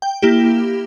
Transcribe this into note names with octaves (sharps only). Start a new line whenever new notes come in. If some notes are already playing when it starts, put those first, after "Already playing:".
G5
A#3 E4 G4